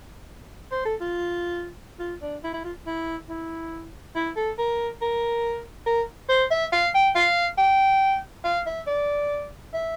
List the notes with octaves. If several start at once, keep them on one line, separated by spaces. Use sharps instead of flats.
C5
A4
F4
F4
D4
E4
E4
F4
E4
E4
E4
A4
A#4
A#4
A#4
C5
E5
F5
G5
F5
G5
F5
E5
D5
E5